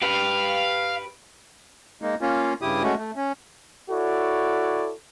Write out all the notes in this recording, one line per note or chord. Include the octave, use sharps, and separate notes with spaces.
G4 B4 F5
G#3 A#3 D#4
A#3 C#4 F4
G2 C#3 E4 G4 D#6
G#3 A3 C#4 F#4
A3
C#4
E4 F#4 A4 C#5 D5